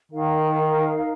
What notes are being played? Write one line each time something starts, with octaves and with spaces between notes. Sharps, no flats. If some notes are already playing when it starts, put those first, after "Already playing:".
D#3 D#4 A#4 F5